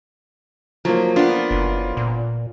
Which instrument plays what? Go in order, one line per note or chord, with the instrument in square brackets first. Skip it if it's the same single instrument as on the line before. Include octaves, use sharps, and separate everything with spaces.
[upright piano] F3 A#3 [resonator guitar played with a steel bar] F#3
[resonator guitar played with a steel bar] B3 D4 [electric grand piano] F4
[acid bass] F#1
A#2